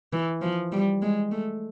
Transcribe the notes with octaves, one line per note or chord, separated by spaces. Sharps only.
E3
F3
G3
G#3
A3